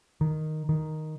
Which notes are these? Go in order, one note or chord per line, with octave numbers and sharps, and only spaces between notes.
D#3
D#3